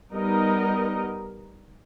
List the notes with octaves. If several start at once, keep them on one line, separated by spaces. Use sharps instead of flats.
G3 B3 D#4 A#4 D#5